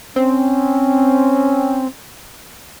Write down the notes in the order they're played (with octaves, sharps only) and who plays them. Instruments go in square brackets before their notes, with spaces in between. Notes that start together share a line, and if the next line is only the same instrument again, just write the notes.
[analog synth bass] C4 [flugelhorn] C#4